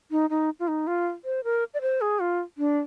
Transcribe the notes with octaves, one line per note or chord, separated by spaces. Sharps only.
D#4
D#4
F4
D#4
F4
C5
A#4
D5
C5
G#4
F4
D4